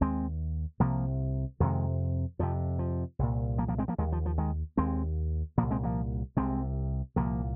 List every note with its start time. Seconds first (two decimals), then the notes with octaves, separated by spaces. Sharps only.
0.01 D#2 G#3 C4
0.80 C2 C3 F3 A#3
1.60 F2 C3 D#3 G#3
2.39 F2 C3 F3
2.79 F3
3.19 C2 A#2
3.58 F3 A#3
3.68 F3 A#3
3.78 G#3 C4
3.88 F3 A#3
3.98 D#2 D#3 G#3
4.12 F3
4.26 F3
4.38 D#3 G#3
4.77 D#2 G#3 C4
5.57 A#2 F3 A#3
5.62 C2
5.71 G#3 C4
5.84 F3 A#3
6.37 C2 C3 G#3 C4
7.16 C2 A#2 F3 A#3